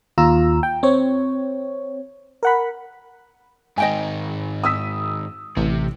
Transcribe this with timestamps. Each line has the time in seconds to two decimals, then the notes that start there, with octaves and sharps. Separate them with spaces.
0.18 D#2 F4 A#5 E6
0.63 G5
0.83 C4 C#5
2.43 A#4 F#5 B5
3.78 G#2 D#3 D#5 G5 G#5
4.64 D#6 E6 B6
5.57 A1 C3